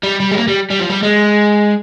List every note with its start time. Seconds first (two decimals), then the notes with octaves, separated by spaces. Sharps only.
0.03 G3
0.20 G3
0.32 G#3
0.37 A#3
0.48 G3
0.70 G3
0.80 F3
0.90 G3
1.03 G#3